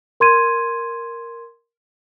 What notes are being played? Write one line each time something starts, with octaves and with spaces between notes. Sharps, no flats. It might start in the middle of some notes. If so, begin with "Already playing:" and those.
A#4 C6 G#6 D#7